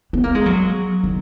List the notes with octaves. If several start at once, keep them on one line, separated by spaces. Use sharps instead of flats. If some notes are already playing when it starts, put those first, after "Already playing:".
B3
A#3
G#3
F#3
D#3